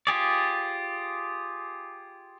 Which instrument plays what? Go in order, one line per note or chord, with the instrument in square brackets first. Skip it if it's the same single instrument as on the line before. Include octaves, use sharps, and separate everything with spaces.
[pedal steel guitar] F4 G4 G#4 D5